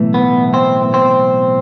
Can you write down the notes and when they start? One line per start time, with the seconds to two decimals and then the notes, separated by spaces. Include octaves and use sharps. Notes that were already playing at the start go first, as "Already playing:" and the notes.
Already playing: B1 A2 E3 A3
0.14 B3
0.54 C4
0.94 C4